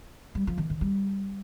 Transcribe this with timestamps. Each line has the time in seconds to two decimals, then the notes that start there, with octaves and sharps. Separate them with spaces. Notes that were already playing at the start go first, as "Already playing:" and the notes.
0.35 G3
0.47 F3
0.58 D#3
0.70 D#3
0.81 G3